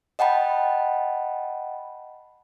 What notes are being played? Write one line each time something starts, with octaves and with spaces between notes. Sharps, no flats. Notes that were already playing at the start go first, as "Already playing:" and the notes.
D#5 F#5 G5 A5 B5